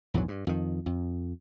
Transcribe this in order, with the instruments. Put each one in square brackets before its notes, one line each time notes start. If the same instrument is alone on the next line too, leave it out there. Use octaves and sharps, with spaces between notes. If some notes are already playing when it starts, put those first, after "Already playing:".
[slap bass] A#1 E2 G#2 F#3
G2
F2 D#3
F2